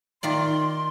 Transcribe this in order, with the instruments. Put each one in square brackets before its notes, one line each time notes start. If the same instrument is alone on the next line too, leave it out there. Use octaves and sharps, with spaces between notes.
[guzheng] D#3 F4 D5 [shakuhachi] C6